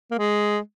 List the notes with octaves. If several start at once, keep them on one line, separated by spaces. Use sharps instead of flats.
A#3
G#3